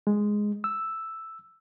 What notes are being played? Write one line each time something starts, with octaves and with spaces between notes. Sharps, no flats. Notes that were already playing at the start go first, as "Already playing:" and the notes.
G#3
E6